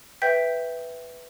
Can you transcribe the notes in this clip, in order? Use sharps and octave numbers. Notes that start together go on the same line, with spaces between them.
B4 E5 G5 G6 B6